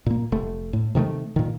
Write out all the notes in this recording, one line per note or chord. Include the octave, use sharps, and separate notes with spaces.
A#2 A#3
F1 A3
A2
C3 D#3 G3 A3
A#2 D#3